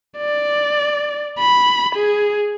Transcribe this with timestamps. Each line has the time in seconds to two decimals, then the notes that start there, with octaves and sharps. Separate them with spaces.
0.18 D5
1.39 B5
1.95 G#4